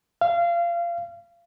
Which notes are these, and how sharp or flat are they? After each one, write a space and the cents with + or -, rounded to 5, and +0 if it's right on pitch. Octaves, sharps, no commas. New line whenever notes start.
F5 -25